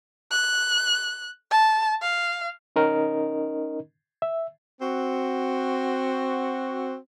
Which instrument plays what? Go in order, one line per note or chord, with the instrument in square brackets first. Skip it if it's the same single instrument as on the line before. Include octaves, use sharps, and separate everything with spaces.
[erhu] F#6
A5
F5
[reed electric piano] C#4 D#4 A#4 D#5
E5
[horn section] C4 F#4